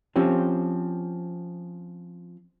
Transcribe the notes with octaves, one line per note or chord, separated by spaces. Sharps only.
F3 C4 C#4 G4